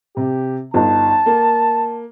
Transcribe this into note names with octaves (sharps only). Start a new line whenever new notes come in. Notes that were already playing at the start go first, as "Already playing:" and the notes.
C3 G4
G1 D#4 A5
A#3